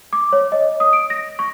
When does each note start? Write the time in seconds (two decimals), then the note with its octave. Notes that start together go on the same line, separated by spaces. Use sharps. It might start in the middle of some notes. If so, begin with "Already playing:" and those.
0.13 D6
0.33 C#5
0.52 D#5
0.80 D#6
0.93 D7
1.10 A#6
1.39 C#6